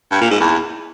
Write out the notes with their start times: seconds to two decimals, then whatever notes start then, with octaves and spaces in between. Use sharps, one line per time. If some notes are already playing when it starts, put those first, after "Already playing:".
0.11 G2
0.21 A#2
0.31 G#2
0.40 E2